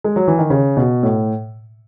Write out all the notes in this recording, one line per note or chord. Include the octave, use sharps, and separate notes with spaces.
G#3
F#3
E3
D#3
C#3
B2
A2